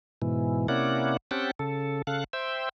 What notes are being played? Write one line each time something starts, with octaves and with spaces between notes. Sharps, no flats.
G#2 B2 E3
C3 A#3 C#4 E4 D5 F#5
C4 C#4 G4 F#5 G5 A5
C#3 A4
C#3 A4 F5 F#6
C5 E5 G5